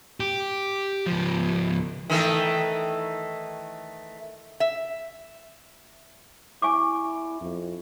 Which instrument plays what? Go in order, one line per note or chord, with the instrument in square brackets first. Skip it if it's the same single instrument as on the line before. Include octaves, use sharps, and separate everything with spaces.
[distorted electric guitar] G4
C#2 F3
[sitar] D#3 E3 A3
[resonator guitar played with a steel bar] E5
[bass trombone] E4 [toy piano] G#5 C#6 D6
[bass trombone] F2